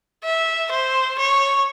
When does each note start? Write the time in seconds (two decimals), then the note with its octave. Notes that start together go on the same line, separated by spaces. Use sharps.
0.24 E5
0.71 C5
1.18 C#5